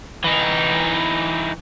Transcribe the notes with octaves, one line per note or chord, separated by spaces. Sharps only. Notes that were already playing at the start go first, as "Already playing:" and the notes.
E3 D#4